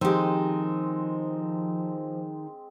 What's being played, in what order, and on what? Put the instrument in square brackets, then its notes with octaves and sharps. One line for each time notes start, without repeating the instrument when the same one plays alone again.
[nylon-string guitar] D#3 G4 [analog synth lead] F3 [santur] G#3 C4